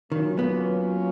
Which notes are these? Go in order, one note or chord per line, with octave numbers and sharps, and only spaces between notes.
D#3 F#3 A#3 C#4 F4
B3